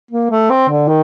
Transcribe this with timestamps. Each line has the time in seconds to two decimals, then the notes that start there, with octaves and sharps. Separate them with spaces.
0.11 A#3
0.30 A3
0.50 C4
0.69 D3
0.88 D#3